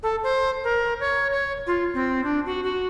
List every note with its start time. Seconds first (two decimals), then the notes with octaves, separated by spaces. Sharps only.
0.03 A4
0.23 C5
0.64 A#4
1.00 C#5
1.31 C#5
1.67 F4
1.94 C4
2.24 D4
2.46 F#4
2.63 F#4